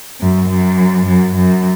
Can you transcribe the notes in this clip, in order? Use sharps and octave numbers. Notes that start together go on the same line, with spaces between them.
F#2
F#2
F#2
F#2